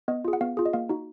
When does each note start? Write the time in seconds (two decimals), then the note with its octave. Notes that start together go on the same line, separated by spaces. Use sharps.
0.08 B3 D#5
0.25 F4 G#4
0.33 F#5
0.41 B3 F5
0.57 F4 G#4
0.66 D#5
0.73 A#3 F5
0.89 D#4 F#4